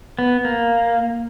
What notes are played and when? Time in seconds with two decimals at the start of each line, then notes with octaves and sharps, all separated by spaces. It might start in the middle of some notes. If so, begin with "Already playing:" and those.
0.19 B3
0.45 A#3